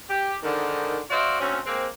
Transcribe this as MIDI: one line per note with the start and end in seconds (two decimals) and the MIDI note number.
0.09 0.37 67
0.43 0.99 44
0.43 0.99 50
0.43 0.99 51
1.10 1.37 66
1.10 1.37 72
1.10 1.37 74
1.10 1.37 76
1.10 1.37 77
1.40 1.59 38
1.40 1.59 60
1.40 1.59 61
1.65 1.87 56
1.65 1.87 58
1.65 1.87 60